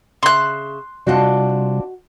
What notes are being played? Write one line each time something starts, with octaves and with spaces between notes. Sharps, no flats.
C#3 E5 C6 F#6
C3 G3 C4 D4 F4 F#4 D#5 F#5